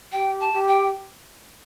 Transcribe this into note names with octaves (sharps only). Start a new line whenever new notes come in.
G4 G5
A5
G4
G5